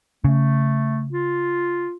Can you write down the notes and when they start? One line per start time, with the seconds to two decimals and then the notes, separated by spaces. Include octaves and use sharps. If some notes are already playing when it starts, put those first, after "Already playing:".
0.24 C#3 A3
1.12 F4